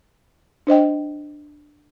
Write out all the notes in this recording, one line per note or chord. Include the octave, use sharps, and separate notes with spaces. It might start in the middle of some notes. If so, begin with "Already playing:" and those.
D4 C5 D#5 G5